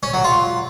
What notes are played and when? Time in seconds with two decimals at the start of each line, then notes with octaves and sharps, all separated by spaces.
0.03 C#4
0.14 F#3
0.24 F4